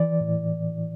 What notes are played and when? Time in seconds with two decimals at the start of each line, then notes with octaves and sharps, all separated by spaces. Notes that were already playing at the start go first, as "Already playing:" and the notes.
Already playing: E3 D5
0.21 A2